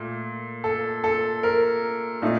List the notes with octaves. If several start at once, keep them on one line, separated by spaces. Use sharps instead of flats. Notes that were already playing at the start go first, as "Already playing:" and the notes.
Already playing: A#2 A3
A4
A4
A#4
A#2 A3 D#4